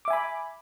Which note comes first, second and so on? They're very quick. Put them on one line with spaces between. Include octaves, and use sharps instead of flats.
D6 E5 G#5 B5